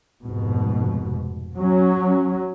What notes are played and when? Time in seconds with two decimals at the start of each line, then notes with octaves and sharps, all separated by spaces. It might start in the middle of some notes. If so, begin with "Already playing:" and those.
0.25 F1 G#2 B2
1.55 F#3 C#4